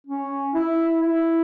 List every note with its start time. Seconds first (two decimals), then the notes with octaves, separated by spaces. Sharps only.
0.07 C#4
0.54 E4
1.01 E4